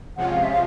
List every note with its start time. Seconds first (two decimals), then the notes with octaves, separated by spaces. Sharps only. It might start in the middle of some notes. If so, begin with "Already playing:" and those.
0.17 C3 F3 G#3 C#4 F4 F#5
0.31 F5
0.44 E5
0.52 F5